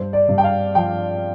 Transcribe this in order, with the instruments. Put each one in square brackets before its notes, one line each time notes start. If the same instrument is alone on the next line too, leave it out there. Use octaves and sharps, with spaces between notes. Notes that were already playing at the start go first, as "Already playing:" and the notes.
Already playing: [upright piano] G2 C5
D5
G2
G5
F5
F3 G5